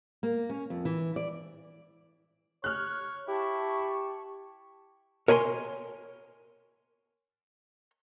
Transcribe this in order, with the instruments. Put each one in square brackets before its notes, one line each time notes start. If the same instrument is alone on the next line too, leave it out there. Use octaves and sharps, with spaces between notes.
[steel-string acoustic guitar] A#3
C#4
F2
E3
D5
[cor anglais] C#5 [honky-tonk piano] F6 F#6
[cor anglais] E4 [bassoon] G4 [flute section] A5 C#6
[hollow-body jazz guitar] A#4 C#5 G#5 A#5 C6